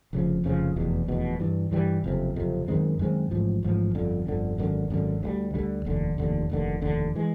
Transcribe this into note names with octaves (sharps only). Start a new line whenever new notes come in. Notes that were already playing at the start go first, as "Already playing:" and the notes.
F1 F2 C#3 F3
F1 F2 C#3 F3
F1 E2 B2
F1 E2 B2
G2 E3 G3
G2 E3 G3
F#1 F2 C3
F#1 F2 C3
F#2 D#3 G#3 C4
F#2 D#3 G#3 C4
A1 G#2 F3
A1 G#2 F3
G1 F2 D3
G1 F2 D3
G#1 F#2 D3
G#1 F#2 D3
D2 D3 G3
D2 D3 G3
F1 D#2 D3
F1 D#2 D3
F1 D#2 D3
F1 D#2 D3
E3 G#3